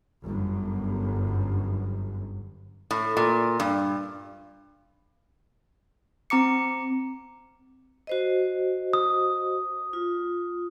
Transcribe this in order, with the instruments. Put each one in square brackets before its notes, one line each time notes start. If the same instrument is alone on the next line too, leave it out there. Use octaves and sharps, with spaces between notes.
[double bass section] G1 F#2
[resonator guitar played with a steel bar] A2
A#2
G2
[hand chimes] C4 A#5 D6 C#7
[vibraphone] F#4 C5 D#5
[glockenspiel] D#6
[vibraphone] F4